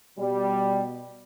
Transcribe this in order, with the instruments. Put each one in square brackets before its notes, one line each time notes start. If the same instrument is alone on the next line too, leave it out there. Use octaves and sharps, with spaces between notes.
[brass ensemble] B2 G3